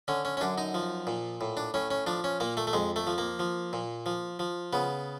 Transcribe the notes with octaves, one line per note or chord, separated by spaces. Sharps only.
D3 C#4
C#4
C#4
F#2 D4
D#4
F3
A#2
A2
D4
A2 C#4
C#4
F3 D4
C#4
A#2 A#3
A3
A3
F2 G#3
A3
F3
A#3
F3
A#2
F3
F3
C#3 B3